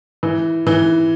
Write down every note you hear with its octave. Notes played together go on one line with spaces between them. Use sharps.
E3
E3